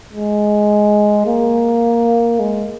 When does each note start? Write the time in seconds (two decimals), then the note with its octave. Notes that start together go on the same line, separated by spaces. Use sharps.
0.13 G#3
1.27 A#3
2.40 G#3